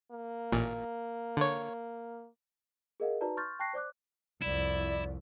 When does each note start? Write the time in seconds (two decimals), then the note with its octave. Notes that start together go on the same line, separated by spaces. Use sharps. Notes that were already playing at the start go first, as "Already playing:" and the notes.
0.11 A#3
0.52 A1 A#2
1.37 D3 C#5
3.00 G#4 A#4 D#5 F5 F#5
3.21 D#4 F#4 B4 D5 A5 A#5
3.37 C6 C#6 F6 G6 A6
3.59 G5 A5 C#6 F#6 A#6 C7
3.73 C5 D5 D6 F#6
4.42 C2 F2 E4 D5